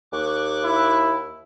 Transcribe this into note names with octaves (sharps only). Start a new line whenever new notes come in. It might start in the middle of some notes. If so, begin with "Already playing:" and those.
D#2 C#6 D6 F#6
E4